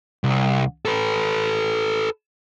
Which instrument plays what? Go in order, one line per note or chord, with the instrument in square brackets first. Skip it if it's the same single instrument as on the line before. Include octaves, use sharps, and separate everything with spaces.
[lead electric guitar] C2
A4 B4